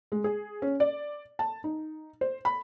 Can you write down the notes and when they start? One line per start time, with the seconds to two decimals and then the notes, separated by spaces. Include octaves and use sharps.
0.12 G#3
0.24 G#4
0.62 C#4
0.80 D5
1.39 A5
1.64 D#4
2.21 C5
2.45 B5